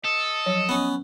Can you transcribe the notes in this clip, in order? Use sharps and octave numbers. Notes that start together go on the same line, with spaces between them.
A4 D#5
F3 F#3 C#5
B3 C#4